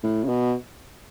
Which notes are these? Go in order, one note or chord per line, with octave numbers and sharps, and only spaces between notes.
A2
C#3
B2